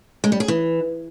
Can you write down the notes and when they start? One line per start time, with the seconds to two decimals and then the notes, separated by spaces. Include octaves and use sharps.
0.24 G#3
0.32 G3
0.40 G#4
0.48 E3